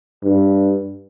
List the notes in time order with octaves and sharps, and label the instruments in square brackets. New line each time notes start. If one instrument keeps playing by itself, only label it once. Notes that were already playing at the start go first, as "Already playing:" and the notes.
[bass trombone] G2